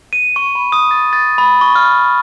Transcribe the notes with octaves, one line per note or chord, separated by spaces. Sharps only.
D#7
C#6
B5
D#6
A6
A6
B5
C#6
F6